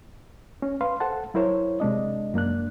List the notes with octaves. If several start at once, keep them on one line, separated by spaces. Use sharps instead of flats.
C#4
B4 F5 C6
A4 C5 F#5 A5
F#3 E4 A#4 C5 C#5
C3 G#3 D4 D#5
F#2 A#3 D4 F#6